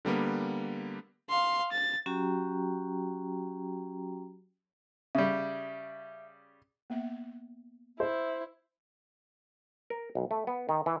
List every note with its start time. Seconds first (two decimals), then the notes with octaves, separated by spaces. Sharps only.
0.05 D3 G3 A#3 B3
1.29 F5 C6
1.72 A6
2.06 F#3 C#4 F#4 G4 G5 A#5
5.15 C#3 G3 E5
6.90 A#3 B3 E5
8.00 E4 C5
9.90 A#4
10.15 B1
10.31 A3
10.47 B3
10.69 D#3
10.86 E3